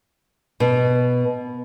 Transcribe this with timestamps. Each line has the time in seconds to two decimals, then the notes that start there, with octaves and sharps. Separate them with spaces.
0.60 B2